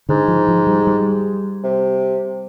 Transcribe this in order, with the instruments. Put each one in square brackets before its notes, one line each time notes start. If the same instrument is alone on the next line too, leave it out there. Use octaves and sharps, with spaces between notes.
[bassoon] G#2 [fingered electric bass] D3
[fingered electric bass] F3
F3
G3
G3
[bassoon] C3